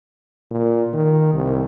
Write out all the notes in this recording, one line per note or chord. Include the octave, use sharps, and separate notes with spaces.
A#2
D#3
C2